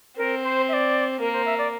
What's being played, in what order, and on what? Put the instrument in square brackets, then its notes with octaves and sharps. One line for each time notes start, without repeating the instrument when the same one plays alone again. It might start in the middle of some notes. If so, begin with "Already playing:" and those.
[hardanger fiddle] C4 [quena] A#4
[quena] C5
E5
D5
[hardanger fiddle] A#3 [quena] A#4
[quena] C5
E5
D5